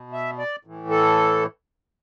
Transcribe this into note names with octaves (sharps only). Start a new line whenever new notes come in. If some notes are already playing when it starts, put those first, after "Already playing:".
Already playing: B2
E5
D5
A2 E3
A4